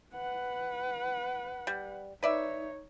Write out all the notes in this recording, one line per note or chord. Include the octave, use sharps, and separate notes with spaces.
B4 F#5
G3
D#4 B4 C#5 D5 E5